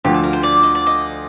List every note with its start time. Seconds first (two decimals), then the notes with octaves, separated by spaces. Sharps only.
0.05 D2 D3 F3 G4
0.14 A4
0.23 A#4
0.33 C5
0.43 D5
0.63 D#5
0.75 D5
0.86 D#5